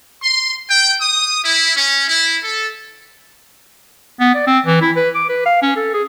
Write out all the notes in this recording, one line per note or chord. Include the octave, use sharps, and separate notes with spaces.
C6
G5
D#6
E4
C#4
E4
A4
B3
D5
C4
E3
E4
B4
D6
B4
F5
C#4
A4
G#4